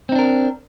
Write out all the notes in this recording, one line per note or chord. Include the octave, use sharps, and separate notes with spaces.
C4 D4 D#4 A#4